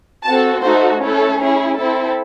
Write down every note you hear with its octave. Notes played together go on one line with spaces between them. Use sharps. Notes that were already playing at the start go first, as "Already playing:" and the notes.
C4 F#4 A4 A5
A3 D#4 F#4 A4 C5
A3 C#4 E4 A4
C#4 E4 G#4
C4 E4 A4